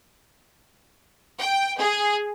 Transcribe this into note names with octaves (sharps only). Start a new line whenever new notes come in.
G5
G#4